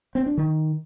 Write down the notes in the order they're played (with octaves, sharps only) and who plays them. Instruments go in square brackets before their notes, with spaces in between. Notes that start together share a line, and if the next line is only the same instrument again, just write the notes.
[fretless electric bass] C4
D4
D#3